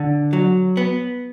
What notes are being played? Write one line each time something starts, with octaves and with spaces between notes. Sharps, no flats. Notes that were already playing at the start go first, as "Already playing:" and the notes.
Already playing: D3
F#3
B3